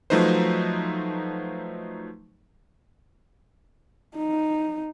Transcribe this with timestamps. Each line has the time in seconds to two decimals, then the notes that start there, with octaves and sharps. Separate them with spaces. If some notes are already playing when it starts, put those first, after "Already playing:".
0.10 F3 F#3 A3 D#4 B4 C5
4.17 D#4